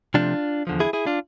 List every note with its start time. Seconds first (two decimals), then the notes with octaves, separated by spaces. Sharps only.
0.14 C3 F3 A3 D4 F4
0.67 E2 D3 F3
0.80 E4 G#4
0.93 E4 G#4
1.06 D4 F4